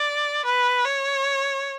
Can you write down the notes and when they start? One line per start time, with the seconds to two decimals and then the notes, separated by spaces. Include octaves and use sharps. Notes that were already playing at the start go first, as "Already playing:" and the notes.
Already playing: D5
0.45 B4
0.85 C#5